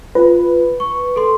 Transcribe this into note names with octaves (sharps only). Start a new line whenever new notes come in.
F4 B4
C#6
A4 C6